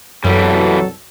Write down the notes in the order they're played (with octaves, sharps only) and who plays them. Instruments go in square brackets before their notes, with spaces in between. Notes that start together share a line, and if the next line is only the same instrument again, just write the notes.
[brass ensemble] C2 B2 A4 [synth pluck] F#2 [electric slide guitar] E3 G3 [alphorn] F#3